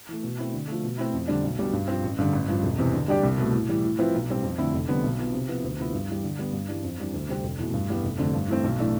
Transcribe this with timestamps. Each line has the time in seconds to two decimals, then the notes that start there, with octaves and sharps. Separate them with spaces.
0.09 E3 A3
0.23 B2
0.38 A3 C4 E4
0.53 D3
0.68 F3 A3
0.83 B2
0.98 A3 C4 E4
1.14 F2
1.28 D3 G3 D4
1.43 B1
1.59 B2 G3 D4
1.73 G2
1.88 F3 C4
2.03 A1
2.18 G2 D3
2.33 A1
2.48 G2 F3
2.63 E1
2.79 E2 C3 E3
2.94 D3
3.08 G3 D4 G4 D5
3.23 C2
3.38 B2 A3
3.53 A2
3.69 E3 G3
3.84 A2
3.99 F3 C4 E4 B4
4.14 B1
4.28 A2 G3 C4
4.43 F2
4.58 D3 A3 C4 E4
4.73 F1
4.88 F2 D3 G3 B3
5.04 B1
5.19 B2 B3 F4
5.33 C3
5.48 F3 B3 E4 B4
5.64 D2
5.79 C3 F3 B3 E4
5.93 G2
6.08 E3 G3
6.24 D3
6.39 G3 B3
6.53 G2
6.69 E3 G3 D4
6.83 F2
6.98 E3 G3 D4
7.14 D2
7.29 C3 G3 C4
7.43 F1
7.59 E2 B2 A3
7.74 G2
7.89 E3 G3 B3
8.03 F1
8.18 F2 D3 A3
8.34 G2
8.48 E3 A3 C4
8.64 B1
8.78 A2 E3 A3 D4